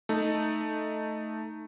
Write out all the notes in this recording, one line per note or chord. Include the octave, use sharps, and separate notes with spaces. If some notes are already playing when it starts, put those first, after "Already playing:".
A3 D#4